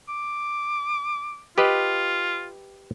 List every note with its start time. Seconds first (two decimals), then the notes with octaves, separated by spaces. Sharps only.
0.09 D6
1.58 F4 G4 B4 D#5